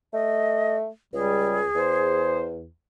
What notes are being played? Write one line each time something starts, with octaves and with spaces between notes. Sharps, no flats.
A3 D#5
C#2 G3 G#4
E2 C5